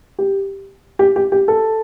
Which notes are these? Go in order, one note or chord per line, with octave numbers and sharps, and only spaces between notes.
G4
G4
G4
G4
A4